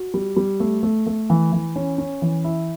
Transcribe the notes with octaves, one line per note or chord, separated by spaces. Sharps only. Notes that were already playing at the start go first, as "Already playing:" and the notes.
Already playing: F#4
G3
G3
A3
A3
A3
E3
E3
C#4
C#4
E3
E4